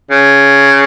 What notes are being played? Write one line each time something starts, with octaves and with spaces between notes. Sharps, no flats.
C#3